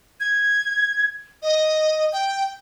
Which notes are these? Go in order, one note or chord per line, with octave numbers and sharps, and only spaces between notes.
G#6
D#5
G5